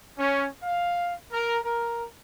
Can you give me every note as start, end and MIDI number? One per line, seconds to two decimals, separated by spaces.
0.17 0.46 61
0.63 1.12 77
1.31 1.58 70
1.64 2.04 70